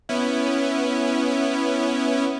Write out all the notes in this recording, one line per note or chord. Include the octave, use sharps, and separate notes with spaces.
B3 C#4 E4